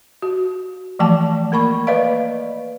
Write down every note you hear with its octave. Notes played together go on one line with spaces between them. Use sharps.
F#4
E3 F3 A3 D5 G5 A5
A#3 A#4 B5 C#6
B4 D5 D#5 F5